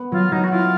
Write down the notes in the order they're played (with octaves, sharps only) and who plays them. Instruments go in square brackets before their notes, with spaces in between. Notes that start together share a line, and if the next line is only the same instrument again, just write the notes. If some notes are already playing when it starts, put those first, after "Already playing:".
Already playing: [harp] B3
[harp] F#3 [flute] F4
[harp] F#3 [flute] D#4
[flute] F#4
[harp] E4 [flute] F4